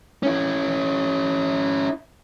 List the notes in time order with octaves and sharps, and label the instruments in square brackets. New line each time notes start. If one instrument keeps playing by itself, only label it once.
[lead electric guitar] C#4 E4